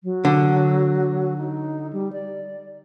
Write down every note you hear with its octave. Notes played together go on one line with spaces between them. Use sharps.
F#3
D3
D#4
G3
D5